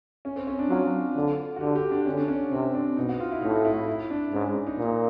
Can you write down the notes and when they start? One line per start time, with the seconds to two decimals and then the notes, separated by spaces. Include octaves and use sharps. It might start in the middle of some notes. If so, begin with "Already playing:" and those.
0.25 C#4
0.36 C4
0.47 C#4
0.59 D4
0.69 F#3 F4
1.16 D3
1.56 F#4
1.61 D3 G4
1.75 G4
1.91 D4
2.06 D3 C#4
2.17 D4
2.28 C#4
2.52 C3 C4
2.74 D4
2.97 B2 D#4
3.09 F#4
3.20 F4
3.31 E4
3.42 A2 D#4
3.65 E4
3.87 E4
4.10 D4
4.33 G#2 C#4
4.55 D4
4.67 D#4
4.78 A#2